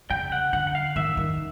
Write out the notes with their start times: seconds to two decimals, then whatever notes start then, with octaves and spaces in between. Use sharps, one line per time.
0.10 C#3 G5
0.32 F#5
0.53 D3 F#5
0.67 F#5
0.75 F5
0.96 D#3 E5
1.17 D#3